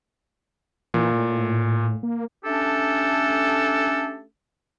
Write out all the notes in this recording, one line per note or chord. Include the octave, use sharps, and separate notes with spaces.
A#2 E3
A2
A#3
A3 C#4 D4 G4 A4